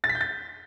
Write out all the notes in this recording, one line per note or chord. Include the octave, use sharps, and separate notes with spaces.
A6
B6
G6
A6